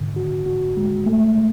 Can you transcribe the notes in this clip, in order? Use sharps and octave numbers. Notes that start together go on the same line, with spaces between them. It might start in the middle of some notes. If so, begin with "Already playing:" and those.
Already playing: G#2 D3
F#4
F#4
G#3
A3
B2